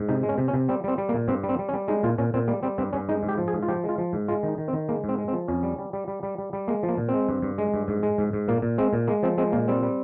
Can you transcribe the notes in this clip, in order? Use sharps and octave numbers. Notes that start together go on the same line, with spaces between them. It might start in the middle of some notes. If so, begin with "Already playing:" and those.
Already playing: G#2
C3 D#4
G#3
C#4
C3
C#4
C3
G3 C4
G3 C4
G3
A#3
A#2
G2 C4
G3
C4
G3
C#4
G3
G#3 D#4
A#2 F4
A#2 C#4
A#2 C4
G3 A#3
G3 C4
G2 C4
G2 C#4
G#3 D#4
G#2
G4
F3
G#4
G#2
F4
F3 G4
G#3
F4
F3
G#2
G#3 F4
D#3
D#4
D#3
C4
D#3
G#3 A#3
G#2 C4
G#3
C4
F3
F2 C#4
G3
G3
G3
G3
G3
G3
G3
G#3 A#3
F3
A#3
A#2
C4
G#3
G2
G2
G#3
G2
G#2
G#3
G#2
G#2
A#2 A#3
A#2
G#3 C4
A#2
G#3 A#3
F3 C4
G#3 C4
A#2 A#3
G3 C4
G3